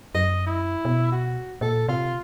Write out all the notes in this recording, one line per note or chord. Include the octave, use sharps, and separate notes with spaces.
F#2 D#5
E4
B2
F#4
A#2 A4
C3 F4